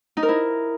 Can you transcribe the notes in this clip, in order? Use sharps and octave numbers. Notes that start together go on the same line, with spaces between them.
D#4
A#4
E4